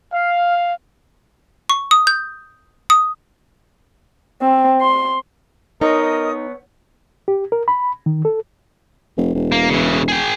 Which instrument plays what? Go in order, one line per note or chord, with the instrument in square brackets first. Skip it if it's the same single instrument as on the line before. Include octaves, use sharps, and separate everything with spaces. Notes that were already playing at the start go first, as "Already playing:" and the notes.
[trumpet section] F5
[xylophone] C#6
D#6
G6
D#6
[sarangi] C4
C6
[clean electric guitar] B3 C#5 [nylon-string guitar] D#4 [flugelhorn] A#4 [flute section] D#5 D#6
[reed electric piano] G4
A#4
B5
D#3
A4
[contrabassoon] F1
E1
[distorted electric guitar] A#3
C#3 E3
G#4 G5